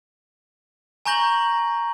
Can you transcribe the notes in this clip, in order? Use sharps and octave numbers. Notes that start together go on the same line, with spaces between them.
G#5 A#5 C#6 G6 A#6 F#7